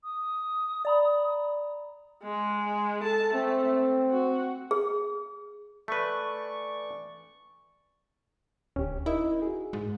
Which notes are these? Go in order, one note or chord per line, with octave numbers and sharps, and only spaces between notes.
D#6
D5 A#5 B5
G#3
A4 A5
A3 C4
F#4
G#4
E3 A3 B4 D5 C#6
D1 C#4 G4
D#4 E4 A#4 D#5
F#4 G#4
G#2